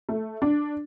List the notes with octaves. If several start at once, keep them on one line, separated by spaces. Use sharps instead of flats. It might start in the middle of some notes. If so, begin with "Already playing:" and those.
A3
D4